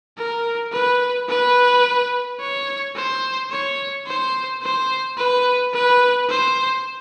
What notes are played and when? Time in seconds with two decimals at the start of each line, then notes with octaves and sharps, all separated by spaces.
0.18 A#4
0.72 B4
1.29 B4
2.40 C#5
2.96 C5
3.51 C#5
4.06 C5
4.62 C5
5.18 B4
5.74 B4
6.30 C5